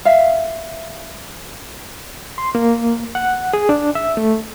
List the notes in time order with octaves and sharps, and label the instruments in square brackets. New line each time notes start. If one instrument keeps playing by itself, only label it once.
[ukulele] E5 F5
[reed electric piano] C6
A#3
F#5
G#4
D4
E5
A3